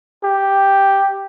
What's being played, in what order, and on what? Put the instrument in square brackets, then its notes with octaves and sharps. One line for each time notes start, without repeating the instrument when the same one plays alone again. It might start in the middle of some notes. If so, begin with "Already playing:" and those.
[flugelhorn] G4